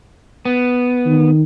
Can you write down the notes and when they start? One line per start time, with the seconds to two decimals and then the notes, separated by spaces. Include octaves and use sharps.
0.45 B3
1.06 D#3